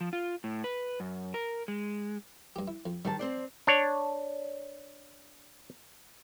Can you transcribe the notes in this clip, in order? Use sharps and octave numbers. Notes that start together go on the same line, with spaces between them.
F3
F4
A2
B4
F#2
A#4
G#3
G2 G4
E4
F2
G#2 D#3 G3 A5
C4 C5 D5
D4 C#5